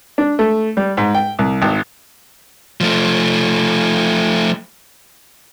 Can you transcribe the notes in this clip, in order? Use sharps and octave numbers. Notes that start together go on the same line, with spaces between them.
D4
A3
G3
G#2
G5
C2
G#1
F3 A3